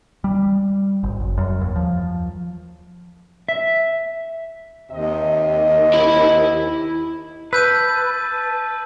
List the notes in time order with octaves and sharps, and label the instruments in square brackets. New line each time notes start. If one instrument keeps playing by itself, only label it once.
[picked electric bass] G3
G#1
F#1
F#2
D#2
F3
[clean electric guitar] E5
[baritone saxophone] D#2 [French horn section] C3 D#5
[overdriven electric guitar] E4 B5
[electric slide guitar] B4 [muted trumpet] A5 [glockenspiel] E6 G6 D#7